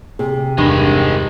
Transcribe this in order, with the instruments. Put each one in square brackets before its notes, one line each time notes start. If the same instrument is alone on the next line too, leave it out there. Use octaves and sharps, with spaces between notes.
[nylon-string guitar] C3 [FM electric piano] G#4
[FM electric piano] E2 [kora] G2 [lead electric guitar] D#3 G#3